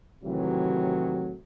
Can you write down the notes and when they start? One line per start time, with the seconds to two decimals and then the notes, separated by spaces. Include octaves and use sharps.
0.24 A2 C3 D#3 E3 F#3 G4